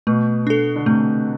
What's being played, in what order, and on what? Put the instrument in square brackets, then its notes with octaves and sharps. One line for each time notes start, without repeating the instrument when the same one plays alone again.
[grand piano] B2 [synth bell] A3
[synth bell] D4 A4
[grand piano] D3
[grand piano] C3 [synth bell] A3